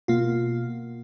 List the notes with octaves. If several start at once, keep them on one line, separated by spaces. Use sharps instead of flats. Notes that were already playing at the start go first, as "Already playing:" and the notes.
B2 A#3 F4